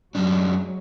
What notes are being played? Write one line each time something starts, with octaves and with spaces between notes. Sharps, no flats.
F#2 F#3 G#3 D4